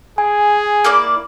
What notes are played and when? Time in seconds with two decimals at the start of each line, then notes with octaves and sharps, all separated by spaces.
0.18 G#4 G#5
0.84 A#3 E4 D5